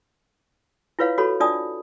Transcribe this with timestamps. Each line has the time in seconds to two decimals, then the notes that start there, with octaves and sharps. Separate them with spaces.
0.99 E4 F4 B4 C#5 F5
1.18 F#4 A4 C#5 B5
1.40 D4 F4 D5 A5 D#6